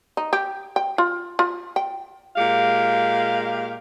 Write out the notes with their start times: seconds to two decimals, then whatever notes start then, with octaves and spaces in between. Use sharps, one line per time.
0.17 D#4
0.33 G4
0.76 G5
0.98 F4
1.39 F4
1.76 G5
2.36 A#2 G#3 G4 F5